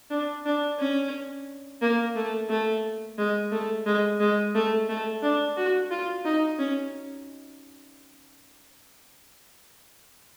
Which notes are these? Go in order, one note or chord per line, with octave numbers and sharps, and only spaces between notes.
D4
D4
C#4
A#3
A3
A3
G#3
A3
G#3
G#3
A3
A3
D4
F#4
F4
D#4
C#4